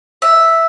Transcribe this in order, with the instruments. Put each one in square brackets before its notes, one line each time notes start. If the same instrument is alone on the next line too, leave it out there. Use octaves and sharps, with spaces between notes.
[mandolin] E5